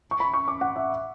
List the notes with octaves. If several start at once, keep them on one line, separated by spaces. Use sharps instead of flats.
C#6
B5
C#6
D6
F#5
E5